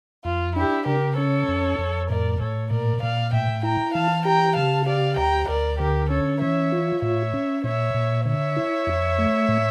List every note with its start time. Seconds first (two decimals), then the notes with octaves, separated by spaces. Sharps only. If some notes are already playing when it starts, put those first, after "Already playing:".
0.25 F2 F4
0.56 D4 E4 G4
0.86 C#3 G4 A#4
1.17 C#4 A4 C#5
1.48 F2
1.79 F2
2.10 A2 A#4 D5
2.40 A2 A4 C#5
2.71 A#2 A#4 D5
3.02 A#2 D5 F5
3.33 A2 E5 G5
3.63 E4 G5 A#5
3.94 E3 F5 A5
4.25 G4 G5 A#5
4.56 C#3 F5 A5
4.86 G4 D5 F5
5.17 D2 G5 A#5
5.48 D2 A#4 D5
5.79 D3 G4 A#4
6.10 C#4 A4 C#5
6.41 E3 C#5 E5
6.72 F4
7.02 A2 C#5 E5
7.34 C#4
7.64 A#2 C#5 E5
7.95 A#2
8.26 D3 C#5 E5
8.57 E4
8.87 F2
9.18 A3
9.49 A2